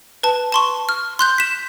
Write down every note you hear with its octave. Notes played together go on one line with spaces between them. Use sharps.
B4 A5
A5 C6 C#6
F6
C6 F#6 G6
B6 E7